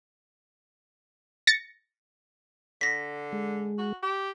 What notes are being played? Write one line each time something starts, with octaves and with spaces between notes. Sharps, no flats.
A6 A#6 C#7
D3 A#6 B6
G#3
F#4
G4